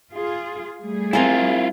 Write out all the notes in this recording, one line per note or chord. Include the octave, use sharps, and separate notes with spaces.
F4 G#4
G3 A3 G#4
C4 E4 F4 A#4 G#5